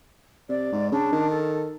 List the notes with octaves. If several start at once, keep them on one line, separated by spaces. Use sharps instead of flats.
C3 D5
G#2
C#3 D4
D#3
A4